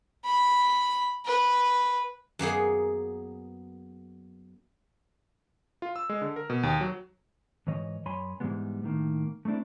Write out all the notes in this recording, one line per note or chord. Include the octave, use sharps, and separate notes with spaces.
B5
B4
F#2 A#3 B3 G#4
F4
E6
G#3
D3
A#4
B2
D#2
F#3
G#2 E3 C#5 D#5
F#2 C#5 G#5 B5 C6
G#2 D3 E3 G3 G#3 B3
A2 D#3 A#3
A3 A#3 C4 D4 E4